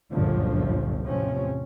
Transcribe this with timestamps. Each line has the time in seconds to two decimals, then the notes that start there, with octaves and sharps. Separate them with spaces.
0.11 G1 C#2 F#2 A#2 D3 F3
1.05 A1 E2 C3 F3 C4 C#4